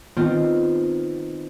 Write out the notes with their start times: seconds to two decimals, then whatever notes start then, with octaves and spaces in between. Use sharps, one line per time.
0.17 D#3 B3 C4 F4